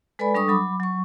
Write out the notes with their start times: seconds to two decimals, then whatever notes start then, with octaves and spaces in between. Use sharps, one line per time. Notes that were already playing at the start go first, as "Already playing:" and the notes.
0.19 G#3 A4 B4 D5 G#5 B5
0.35 G3 D4 A4 C#6 D#6
0.48 F#3 B5 D6
0.80 F#3 C#6